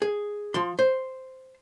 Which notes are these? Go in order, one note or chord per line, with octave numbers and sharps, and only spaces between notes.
G#4
F3 C6
C5